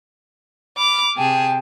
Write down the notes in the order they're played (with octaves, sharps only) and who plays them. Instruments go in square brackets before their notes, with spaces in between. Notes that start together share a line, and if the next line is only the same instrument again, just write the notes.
[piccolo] B5 [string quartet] D6 F6
[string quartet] C3 G#4 A5 [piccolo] G5